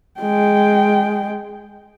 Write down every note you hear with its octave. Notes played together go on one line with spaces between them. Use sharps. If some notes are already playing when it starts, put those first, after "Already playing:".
G#3 G5